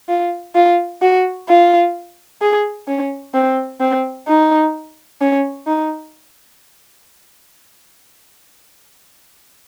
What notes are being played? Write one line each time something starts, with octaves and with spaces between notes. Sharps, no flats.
F4
F4
F#4
F4
G#4
C#4
C4
C4
D#4
C#4
D#4